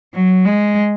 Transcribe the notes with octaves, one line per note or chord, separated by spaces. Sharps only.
F#3
G#3